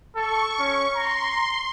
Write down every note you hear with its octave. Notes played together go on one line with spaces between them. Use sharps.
A4 C#6
C#4
A#5 C6